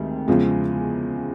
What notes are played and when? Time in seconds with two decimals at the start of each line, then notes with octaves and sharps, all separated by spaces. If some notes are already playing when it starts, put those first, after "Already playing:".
Already playing: D2 C3 D#3 G#3
0.28 E2 C#3 F3 G#3